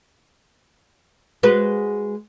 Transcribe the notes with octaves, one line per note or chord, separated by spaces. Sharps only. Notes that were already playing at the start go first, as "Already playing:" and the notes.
G#3 F#4 B4